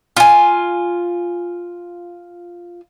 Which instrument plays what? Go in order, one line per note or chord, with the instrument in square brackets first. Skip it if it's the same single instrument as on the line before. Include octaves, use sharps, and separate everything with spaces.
[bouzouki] F4 G#5